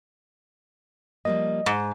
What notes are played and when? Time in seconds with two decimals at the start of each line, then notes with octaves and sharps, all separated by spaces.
1.25 F3 G3 A#3 D#5
1.66 G#2 D#4